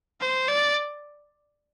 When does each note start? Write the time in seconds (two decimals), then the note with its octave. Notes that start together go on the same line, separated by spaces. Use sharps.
0.21 C5
0.48 D5